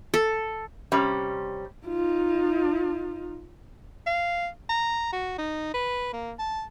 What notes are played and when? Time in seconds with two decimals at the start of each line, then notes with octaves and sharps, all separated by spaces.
0.14 A4
0.92 C3 G3 C#4
1.87 D#4 F4
4.06 F5
4.69 A#5
5.13 F#4
5.38 D#4
5.74 B4
6.13 A#3
6.39 A5